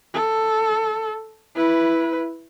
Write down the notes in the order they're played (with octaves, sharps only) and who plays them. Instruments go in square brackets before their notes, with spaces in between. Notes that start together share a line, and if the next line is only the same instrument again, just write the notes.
[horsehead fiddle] A4
E4 B4